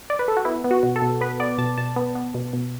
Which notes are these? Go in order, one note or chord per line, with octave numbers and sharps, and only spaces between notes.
D5
B4
A4
F#4
B3 E4
B3
F#4
B2
A4
B2
B3 B4
B3 D5
B2 A5
B2 A5
B3
B3
B2
B2